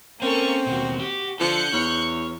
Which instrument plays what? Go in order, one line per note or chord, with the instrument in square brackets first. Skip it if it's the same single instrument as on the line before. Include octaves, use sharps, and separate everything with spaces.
[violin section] A#3 A4 C#6 [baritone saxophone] C4 [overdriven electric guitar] C#4
[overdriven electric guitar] D#2 B2 [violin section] F#4
[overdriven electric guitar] G4
[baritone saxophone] F3 [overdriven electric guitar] D4 A4 [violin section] F#6 G6 C#7
[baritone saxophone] E2 [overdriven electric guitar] C#5